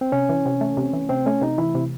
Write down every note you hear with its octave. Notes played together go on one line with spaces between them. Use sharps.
C4
C3 C#4
E3
C3
A3
C3
E3
C3 C4
A3 C#4
C3 D#4
E3 E4
C3